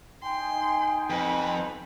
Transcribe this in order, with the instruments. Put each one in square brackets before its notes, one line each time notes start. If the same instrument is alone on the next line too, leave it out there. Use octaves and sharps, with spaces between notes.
[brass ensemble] D#4 G#5 [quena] G5 [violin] C6
[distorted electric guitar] F2 [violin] B4